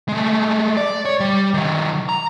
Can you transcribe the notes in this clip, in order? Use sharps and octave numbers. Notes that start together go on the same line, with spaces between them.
G#3 A3
D5
C#5
G3
D#3 F#3
A#5